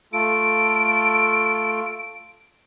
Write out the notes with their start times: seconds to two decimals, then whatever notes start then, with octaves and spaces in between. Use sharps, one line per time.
0.13 A3 F4 A4 D7